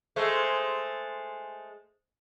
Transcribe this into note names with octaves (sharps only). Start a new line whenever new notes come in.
G#3 A3 C5